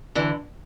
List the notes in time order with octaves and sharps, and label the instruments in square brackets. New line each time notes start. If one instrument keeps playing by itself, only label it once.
[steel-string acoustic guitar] D3 E3